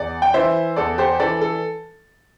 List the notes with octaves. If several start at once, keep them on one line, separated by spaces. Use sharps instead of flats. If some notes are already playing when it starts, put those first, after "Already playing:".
Already playing: E2 D5
G5
E3 C5 E5
E2 A4 D5
G4 C5
E3 A4 D5
A4